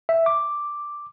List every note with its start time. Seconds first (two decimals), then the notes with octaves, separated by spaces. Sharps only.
0.09 E5
0.26 D6